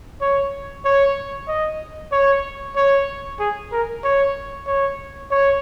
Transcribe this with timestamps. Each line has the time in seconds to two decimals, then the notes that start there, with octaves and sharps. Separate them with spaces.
0.22 C#5
0.85 C#5
1.48 D#5
2.12 C#5
2.77 C#5
3.40 G#4
3.72 A#4
4.04 C#5
4.67 C#5
5.31 C#5